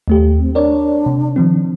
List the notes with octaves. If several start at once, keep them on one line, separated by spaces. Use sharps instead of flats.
D#2 A3 G4
C4
D4 A#4 C#5 D5
C3
D#3 F3 C4